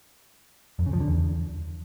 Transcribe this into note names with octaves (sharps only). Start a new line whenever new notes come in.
F2
C#3
F3
D3
E2